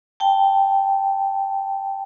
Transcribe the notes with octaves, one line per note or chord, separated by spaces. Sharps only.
G5 A5